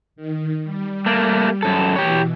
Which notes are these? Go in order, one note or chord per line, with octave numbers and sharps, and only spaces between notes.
D#3
G3
A3 A#3
F#2 A4
B2 E3 G4 C#5